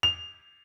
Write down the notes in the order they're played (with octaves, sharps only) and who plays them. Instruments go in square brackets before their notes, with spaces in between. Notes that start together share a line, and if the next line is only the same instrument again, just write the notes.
[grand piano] F7